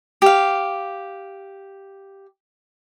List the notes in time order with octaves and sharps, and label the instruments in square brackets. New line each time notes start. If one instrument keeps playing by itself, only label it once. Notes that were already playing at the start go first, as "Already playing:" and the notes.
[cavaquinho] G4 F5